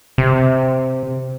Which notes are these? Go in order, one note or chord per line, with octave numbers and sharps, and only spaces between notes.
C3